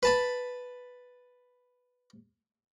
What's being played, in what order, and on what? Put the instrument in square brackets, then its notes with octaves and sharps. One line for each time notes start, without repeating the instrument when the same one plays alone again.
[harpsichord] B4 A5 B5